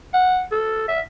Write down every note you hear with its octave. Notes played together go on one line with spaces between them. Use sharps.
F#5
A4
E5